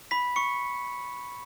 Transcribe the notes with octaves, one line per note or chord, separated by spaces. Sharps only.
B5 B6
C#6 C#7